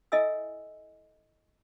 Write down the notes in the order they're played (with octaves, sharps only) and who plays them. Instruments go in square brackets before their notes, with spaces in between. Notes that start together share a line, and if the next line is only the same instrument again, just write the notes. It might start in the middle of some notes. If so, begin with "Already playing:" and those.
[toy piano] E4 A4 D#5 E5 G#5 E6